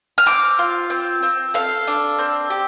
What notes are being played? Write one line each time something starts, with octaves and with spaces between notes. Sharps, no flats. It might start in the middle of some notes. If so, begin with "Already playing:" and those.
F6
C4 D6
F4
C4
C4
A4 F5
D4
C4
G4